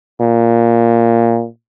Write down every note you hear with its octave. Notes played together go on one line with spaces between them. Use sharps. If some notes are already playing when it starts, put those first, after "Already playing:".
A#2